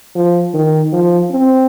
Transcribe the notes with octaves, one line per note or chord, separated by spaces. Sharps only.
F3
D#3
F3
C4